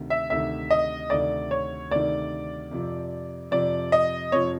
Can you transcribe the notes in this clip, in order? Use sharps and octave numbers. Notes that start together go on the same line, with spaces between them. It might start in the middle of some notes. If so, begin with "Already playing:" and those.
Already playing: D2 C3 D#3
E5
D2 C3 D#3 E5
D#5
D2 C3 D#3 D5
C#5
D2 C3 D#3 D5
F2 C3 F3
F2 C3 F3 D5
D#5
F2 C3 F3 C#5